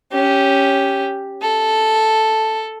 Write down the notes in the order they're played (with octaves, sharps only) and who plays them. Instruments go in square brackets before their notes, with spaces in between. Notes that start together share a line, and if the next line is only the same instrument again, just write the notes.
[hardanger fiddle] C#4 G4
A4